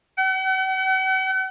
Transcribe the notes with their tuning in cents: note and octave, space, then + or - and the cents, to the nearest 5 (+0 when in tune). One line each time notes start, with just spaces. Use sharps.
F#5 +45